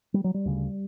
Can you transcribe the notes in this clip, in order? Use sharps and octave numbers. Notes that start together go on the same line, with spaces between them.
G3
F#3
G3
D2 C#3